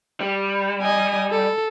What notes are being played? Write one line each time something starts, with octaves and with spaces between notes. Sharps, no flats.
G3
D#5 G#5
A4